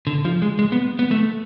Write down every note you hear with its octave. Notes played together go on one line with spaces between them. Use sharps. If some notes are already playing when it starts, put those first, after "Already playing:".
D3
F3
G#3
G#3
B3
B3
A3